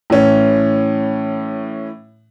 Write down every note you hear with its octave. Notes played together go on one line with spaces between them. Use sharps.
A2 E3 C#4